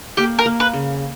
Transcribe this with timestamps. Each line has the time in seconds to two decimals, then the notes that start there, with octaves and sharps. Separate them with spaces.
0.17 A#3 G4
0.39 A#4
0.46 A#3
0.60 B4
0.73 C#3